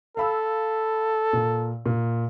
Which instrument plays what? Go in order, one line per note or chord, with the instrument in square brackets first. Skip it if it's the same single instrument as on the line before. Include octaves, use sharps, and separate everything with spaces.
[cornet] A4 [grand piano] F5 B5 E6
[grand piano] A#2
A#2